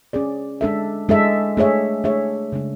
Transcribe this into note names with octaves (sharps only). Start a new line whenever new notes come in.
C#4 G#4 D5
G#3 D4 A4 E5
G#3 D4 A4 E5
A3 D4 G#4 C#5 E5
A3 D4 G#4 C#5 E5
C#3 G#3 D4